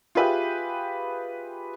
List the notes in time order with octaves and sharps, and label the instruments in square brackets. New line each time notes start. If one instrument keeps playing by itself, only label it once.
[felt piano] F4 G4 G#4 B4 E5 G5